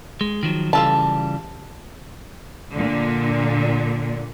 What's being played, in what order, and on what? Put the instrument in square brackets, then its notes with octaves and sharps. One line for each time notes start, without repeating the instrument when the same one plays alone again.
[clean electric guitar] G#3
D#3 F3 F#3
[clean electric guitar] C#3 E3 G3 [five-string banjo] F4 A4 A5
[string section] A#2 D3